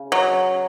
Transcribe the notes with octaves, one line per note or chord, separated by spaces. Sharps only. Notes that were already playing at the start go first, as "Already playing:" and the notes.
Already playing: C#3
F#3